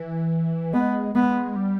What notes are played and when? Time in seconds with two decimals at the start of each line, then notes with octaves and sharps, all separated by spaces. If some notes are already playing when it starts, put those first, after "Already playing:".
Already playing: E3
0.73 G#3 B3
1.15 G#3 B3
1.56 G3